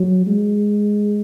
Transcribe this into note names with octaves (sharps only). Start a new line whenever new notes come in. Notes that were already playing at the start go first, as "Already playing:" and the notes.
Already playing: F#3
G#3